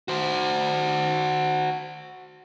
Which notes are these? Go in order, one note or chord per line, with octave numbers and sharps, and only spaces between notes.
F#4 C5